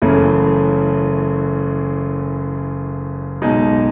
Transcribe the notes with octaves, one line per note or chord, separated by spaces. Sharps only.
F#1 F#2 C#3 E3 A3
B1 B2 G#3 D#4